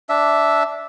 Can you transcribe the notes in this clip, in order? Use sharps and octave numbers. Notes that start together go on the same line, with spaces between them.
D4 E5